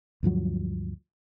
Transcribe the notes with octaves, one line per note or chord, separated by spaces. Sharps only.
D2 G2 F3 F#3